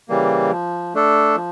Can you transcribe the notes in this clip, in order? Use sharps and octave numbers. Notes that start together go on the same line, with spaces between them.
C#3 E3 G3 A#3
F3
A3 D4 A4
F3